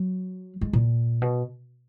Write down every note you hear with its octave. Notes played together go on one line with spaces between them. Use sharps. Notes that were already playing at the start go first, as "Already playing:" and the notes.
Already playing: F#3
G#3
A#2
B2